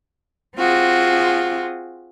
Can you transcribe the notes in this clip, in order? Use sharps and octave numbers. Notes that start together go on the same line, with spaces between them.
C4 F4 F#4 G#4